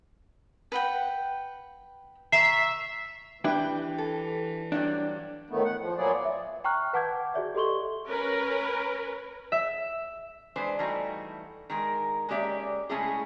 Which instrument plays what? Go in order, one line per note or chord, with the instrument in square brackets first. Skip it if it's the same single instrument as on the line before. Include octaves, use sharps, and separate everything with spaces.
[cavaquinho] B4 F#5 G5
[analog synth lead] E5 [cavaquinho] A#5 C#6 [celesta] C7
[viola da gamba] E3 [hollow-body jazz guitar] D4 E4 G4 [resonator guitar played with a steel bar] B4 G5
[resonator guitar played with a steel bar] A4
[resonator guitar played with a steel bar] G2 F#3 G3 [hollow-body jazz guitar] D4
[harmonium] A2 D#3 A3 B3
F#5
F3
A#2 F#3 A#3 B3 G#4 D5
[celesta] E5
G5 A#5 C#6 F6 F#6
B4 F#5 A5 D6 G6 G#6
F#4 G#4 D5 E5
G4 A4 D#5 C6 C#6 G7
[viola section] C#4 A#4 B4
[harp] E5
[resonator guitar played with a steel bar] E3 G#3 D4 B4 C5
E3 G3 A3 B3 D#4 F#4
D#3 G#3 A#4
G#3 A#3 C#4 G4 D5 E5
C#3 G#3 A3 C#4 E4 G#4